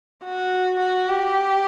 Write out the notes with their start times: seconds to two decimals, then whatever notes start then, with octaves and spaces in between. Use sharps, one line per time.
0.24 F#4
0.80 F#4
1.08 G4